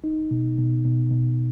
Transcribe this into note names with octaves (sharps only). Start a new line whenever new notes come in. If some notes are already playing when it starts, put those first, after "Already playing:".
D#4
B2
B2
B2
B2